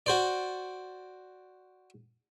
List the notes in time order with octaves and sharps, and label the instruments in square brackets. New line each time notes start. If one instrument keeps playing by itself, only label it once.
[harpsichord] F#4 C5 D5